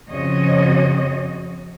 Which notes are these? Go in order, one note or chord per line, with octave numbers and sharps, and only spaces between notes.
F2 C#3 C4 F#4 C#5 D#5